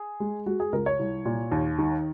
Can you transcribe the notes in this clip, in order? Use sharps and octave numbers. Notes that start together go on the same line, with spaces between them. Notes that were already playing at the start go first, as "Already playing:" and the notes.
Already playing: G#4
G#3
G#3 F#4
G#4
C#2 A#4
C#5
C2
A#2
D#2
D#3